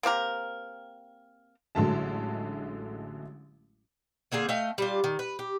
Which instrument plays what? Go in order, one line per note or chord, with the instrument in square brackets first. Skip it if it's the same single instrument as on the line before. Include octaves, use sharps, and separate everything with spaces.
[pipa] A#3 C4 G4 A#4
[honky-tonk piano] A1 D3 F#3 G#3 A3 A5
[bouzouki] D3 A#3 C4 G#4
A3 D#5 F5 G5
G3 D4 F4
D#3
B4
G4